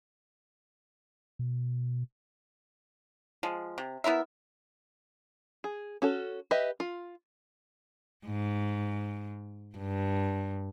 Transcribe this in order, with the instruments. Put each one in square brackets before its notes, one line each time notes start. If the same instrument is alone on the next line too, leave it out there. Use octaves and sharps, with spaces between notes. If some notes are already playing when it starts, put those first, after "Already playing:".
[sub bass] B2
[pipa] F3 G#3
C3
B3 E4 A#4 E5
[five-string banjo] G#4
C#4 F#4 A4
G4 B4 D#5 E5
F4
[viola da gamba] G#2
G2